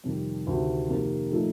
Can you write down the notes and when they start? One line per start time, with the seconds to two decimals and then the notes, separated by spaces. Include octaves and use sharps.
0.04 F2 C3 D#3 G3
0.47 D2 C3 D#3
0.89 F2 C3 D#3 A#3
1.32 A#2 F3 A3 D#4 A4